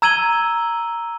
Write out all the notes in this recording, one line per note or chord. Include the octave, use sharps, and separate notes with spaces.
A#5 E6 G#6 D#7 F#7 G7